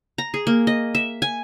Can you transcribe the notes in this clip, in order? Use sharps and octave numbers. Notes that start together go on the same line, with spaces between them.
A#5
G#4
A#3
D#5
E5
G#5